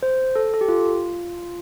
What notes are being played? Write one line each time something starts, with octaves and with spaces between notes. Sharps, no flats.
C5
A4
A4
G4
F4